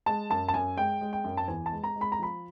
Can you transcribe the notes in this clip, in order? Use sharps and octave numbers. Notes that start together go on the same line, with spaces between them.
G#3 A5
F#2 A5
A5
F#2 G#5
G#3 G5
G#3
G5
F#2
A5
E2 G#5
A5
G#3
A#5
G#3
B5
A#5
F3 B5